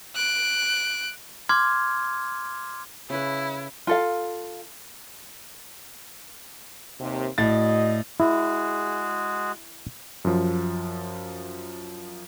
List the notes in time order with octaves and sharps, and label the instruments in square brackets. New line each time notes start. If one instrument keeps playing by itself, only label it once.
[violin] F#6 D7
[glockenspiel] C6 D6 F6 G#6
[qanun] C#3 B4 [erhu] E4
[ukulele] F4 A4 F5
[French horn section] D#2 C3
[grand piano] A2 A6 [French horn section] F#4 D5 D#5
[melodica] G#3 F#4 G#4 [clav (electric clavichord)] E4
[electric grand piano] F#2 F3